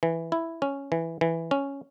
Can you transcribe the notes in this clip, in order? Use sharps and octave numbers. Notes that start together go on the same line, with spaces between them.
E3
E4
C#4
E3
E3
C#4